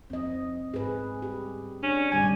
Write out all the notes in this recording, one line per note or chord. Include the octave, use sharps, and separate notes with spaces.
F2 C4 D#5
G#2 G#4 B4
G4
C#4 D4
G#1 D2 D3 G3 D5 G#5